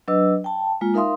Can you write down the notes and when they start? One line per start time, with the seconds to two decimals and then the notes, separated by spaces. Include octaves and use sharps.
0.08 F#3 D4 B4 D#5 E6
0.44 G5 A5
0.81 G#3 A#3 F4
0.94 D#4 A#4 E5 F5 C6 D#6